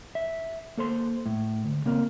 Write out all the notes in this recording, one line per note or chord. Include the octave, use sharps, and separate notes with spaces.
E5
A#3 A4 C5 C6
A2
D2
C#3 A#3 C4 A#4